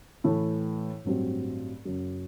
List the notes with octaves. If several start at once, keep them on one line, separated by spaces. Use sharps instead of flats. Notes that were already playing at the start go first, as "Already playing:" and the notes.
A2 E3 A3 E4
A1 G2 F#3 C4
F#1 F#2 F#3